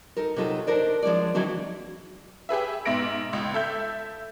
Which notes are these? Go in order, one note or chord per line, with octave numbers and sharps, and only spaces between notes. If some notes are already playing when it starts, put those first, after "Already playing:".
D#4 A4 A#4
C3 F#3 D#4 F4 A4
D4 D#4 A#4 C5 D5
F3 G#3 C#4 D5
D3 E3 F#3 C4 D#4
G4 G#4 B4 E5
G#2 B2 E5 A#6 D7
C#2
A4 E5 G6